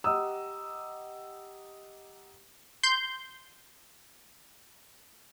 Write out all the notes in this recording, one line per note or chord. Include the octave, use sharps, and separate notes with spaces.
G4 D#5 F#5 A#5 D#6 E6
C6 G6